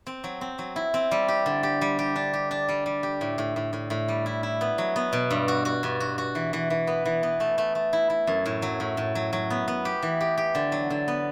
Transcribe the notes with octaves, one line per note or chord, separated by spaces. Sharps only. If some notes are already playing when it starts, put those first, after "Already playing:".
C4
F#3
C4
F#3
E4
C4
G3
G4
D3
G4
G3
G4
D4
G4
D4
G3
G3
G4
A2
A2
A2
A2
A2
G3
E4
E4
B3
F#3
B3
B2
G2
F#4
F#4
G2
F#4
F#4
E3
E3
E3
B3
E3
B3
A3
A3
A3
E4
E4
F#2
A2
F#3
A2
A2
F#3
F#3
B3
B3
G4
E3
G4
G4
D3
F#3
D3
B3